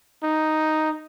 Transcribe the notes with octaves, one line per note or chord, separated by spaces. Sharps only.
D#4